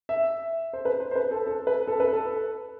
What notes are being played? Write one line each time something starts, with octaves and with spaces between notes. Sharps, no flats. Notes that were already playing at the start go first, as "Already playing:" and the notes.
E5
C5
B4
C5
C5
B4
A4
A4
B4
A4
B4
A4